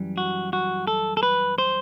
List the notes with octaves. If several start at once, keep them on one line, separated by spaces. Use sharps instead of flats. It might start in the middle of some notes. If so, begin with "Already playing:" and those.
Already playing: F#2 E3 G3
F#4
F#4
A4
A4
B4
C5